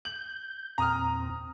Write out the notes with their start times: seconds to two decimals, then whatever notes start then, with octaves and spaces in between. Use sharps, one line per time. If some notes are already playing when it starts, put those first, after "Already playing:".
0.05 G6 F#7
0.78 E2 A#2 C4 A#5 D#6 F6